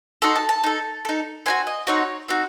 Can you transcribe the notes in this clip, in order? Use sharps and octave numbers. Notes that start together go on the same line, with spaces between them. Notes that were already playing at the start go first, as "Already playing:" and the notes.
D#4 F#4 A4 C6
A5
A5
D#4 A4
D#4 A4
C4 D#4 F#4 G#5
D#5
C4 D#4 F#4 C#5
C4 D#4 F#4